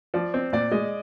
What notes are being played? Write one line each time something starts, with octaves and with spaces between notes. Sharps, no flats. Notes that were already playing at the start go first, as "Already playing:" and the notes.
F3 D5
C4
A#2 D5
G#3 D#5